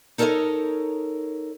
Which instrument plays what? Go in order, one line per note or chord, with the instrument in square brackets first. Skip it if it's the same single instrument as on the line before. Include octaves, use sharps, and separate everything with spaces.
[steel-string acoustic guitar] D#4 A4 A#4 C5 C#5 D#5